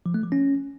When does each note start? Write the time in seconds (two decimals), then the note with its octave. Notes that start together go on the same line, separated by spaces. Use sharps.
0.06 F3
0.14 A3
0.23 F3
0.32 C#4